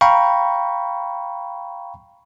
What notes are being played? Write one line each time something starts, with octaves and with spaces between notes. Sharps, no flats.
F5 G5 A#5 B5 C#6